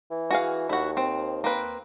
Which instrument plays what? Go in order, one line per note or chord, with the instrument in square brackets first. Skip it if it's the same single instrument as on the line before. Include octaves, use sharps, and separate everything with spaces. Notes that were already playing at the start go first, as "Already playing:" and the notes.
[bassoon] E3
[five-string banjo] F#4 G#4 F5
[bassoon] D#2 [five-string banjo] E4 F#4
[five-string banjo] C4
A#3 C4 B4